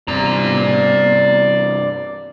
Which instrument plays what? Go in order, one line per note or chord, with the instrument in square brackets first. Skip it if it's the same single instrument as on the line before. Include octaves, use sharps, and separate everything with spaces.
[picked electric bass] G2 C3 [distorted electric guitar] D5 A#5